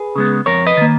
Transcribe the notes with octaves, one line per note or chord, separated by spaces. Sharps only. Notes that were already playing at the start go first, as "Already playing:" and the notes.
Already playing: G#4 B4
C#3 G#3 B3
F2 A#4 C#5
B4 D#5
D#3 A#3